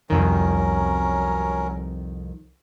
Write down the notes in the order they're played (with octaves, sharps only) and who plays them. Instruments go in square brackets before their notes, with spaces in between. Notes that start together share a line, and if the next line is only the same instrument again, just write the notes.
[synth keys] C2 F2 D#3 [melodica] F#3 C#4 A#4